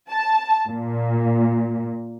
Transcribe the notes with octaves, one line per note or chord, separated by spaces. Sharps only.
A5
A#2